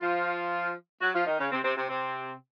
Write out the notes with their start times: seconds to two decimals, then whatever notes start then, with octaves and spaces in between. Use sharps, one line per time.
0.01 F3 F4
1.01 F#3 F#4
1.14 F3 F4
1.26 D#3 D#4
1.39 C#3 C#4
1.52 C3 C4
1.64 C3 C4
1.76 C3 C4
1.89 C3 C4